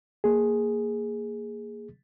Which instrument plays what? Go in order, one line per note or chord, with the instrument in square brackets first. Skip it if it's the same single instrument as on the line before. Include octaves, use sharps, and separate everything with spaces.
[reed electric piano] A#3 G#4